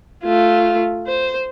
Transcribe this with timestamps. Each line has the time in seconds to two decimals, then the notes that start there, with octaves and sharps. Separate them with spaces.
0.24 A3 F4
1.07 C5